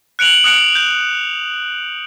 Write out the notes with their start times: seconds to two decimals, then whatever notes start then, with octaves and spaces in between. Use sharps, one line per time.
0.19 F#6 C#7 D7 F7 F#7
0.44 D#6 F#6 C#7 D7
0.75 G6